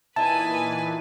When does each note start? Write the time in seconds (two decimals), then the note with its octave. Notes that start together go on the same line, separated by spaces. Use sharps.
0.16 A#2 E3 D#4 E4 B4 G#5 A5